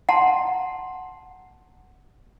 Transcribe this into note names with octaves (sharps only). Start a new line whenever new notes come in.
F#5 A5 A#5 C6